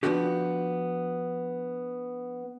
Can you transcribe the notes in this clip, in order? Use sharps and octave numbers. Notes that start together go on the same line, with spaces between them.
F3 F#3 B3 D4 F#4 G4